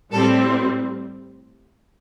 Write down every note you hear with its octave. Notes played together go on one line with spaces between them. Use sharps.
A2 G3 C4 A4